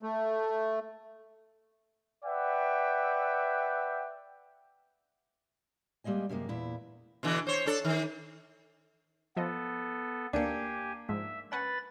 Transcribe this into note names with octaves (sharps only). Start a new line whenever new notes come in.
A3
B4 D5 E5 F#5 G5
G3 G#3 A#3 D#5 G#5
F#2 C3 G#3 A#3
E2 A#2 E4
B2 D3 E3
C5 C#5
D4 A4
D#3
F3 B3 A4 D#5
D2 A#3 D4 G4 G#5 C#7
G#2 F3 G#3 E5
C#4 B4 F#5 G#5 B5 A6